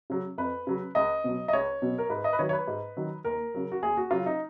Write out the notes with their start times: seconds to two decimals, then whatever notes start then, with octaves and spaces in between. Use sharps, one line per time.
0.10 C#3 F#3
0.38 F2 B4
0.67 C#3 F#3
0.95 C#2 D#5
1.24 B2 F#3
1.48 D#5
1.53 C#2 C#5
1.82 B2 F#3
1.98 A#4
2.10 G#2 B4
2.24 D#5
2.33 B4
2.39 D#3 F#3 C#5
2.49 C#5
2.53 B4
2.68 G#2
2.97 D#3 F#3
3.25 D#2 A#4
3.54 C#3 F#3
3.72 F#4
3.83 D#2 G#4
3.97 F#4
4.11 C#3 F#3 F4
4.26 D#4